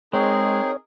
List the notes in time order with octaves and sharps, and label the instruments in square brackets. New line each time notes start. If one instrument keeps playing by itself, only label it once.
[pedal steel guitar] G#3 [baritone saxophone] C4 [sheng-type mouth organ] D#4 G#4 A#4 [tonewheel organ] C#5